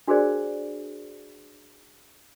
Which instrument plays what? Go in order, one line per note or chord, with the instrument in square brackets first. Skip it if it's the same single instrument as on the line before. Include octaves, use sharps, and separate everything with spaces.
[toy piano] D4 F#4 G#4 A#4 C5 D5